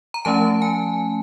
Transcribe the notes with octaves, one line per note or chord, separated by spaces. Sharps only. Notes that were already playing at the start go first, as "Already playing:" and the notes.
A#5
F3 A3 C#4 A5
G#5